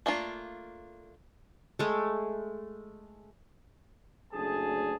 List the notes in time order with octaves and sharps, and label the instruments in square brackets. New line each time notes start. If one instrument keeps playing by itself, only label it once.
[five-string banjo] A3 A#3 D4 F4
[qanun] G#3 A3
[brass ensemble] F#1 D2 G#4 A5